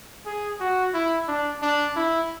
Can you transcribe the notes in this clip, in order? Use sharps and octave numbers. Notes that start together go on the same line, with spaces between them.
G#4
F#4
E4
D4
D4
E4